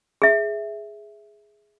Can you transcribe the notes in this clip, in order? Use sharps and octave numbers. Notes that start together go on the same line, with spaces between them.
G#4 E5